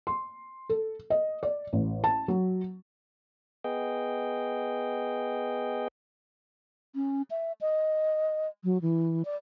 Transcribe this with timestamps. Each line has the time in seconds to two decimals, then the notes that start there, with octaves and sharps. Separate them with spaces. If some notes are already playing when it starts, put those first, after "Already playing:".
0.07 C6
0.69 A4
1.10 D#5
1.43 D5
1.73 A1
2.04 A5
2.28 F#3
3.64 B3 G#4 D#5 G5
6.95 C#4
7.31 E5
7.61 D#5
8.64 F#3
8.82 E3
9.25 D5